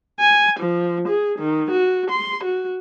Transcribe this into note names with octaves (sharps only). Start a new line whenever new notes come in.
G#5
F3
G#4
D#3
F#4
C6
F#4